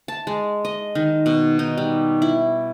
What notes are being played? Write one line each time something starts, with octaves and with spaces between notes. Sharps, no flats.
A5
G#3
D#5
D#3
B2
D#4
G3
E4